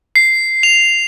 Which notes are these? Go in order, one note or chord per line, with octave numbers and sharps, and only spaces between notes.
C7
F7